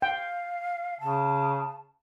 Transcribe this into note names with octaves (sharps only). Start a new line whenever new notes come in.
F5 G5
C#3 A5